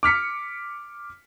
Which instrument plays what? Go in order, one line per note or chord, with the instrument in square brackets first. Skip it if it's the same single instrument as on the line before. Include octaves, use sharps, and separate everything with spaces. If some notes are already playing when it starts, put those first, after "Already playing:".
[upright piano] D6 F6 B6 C#7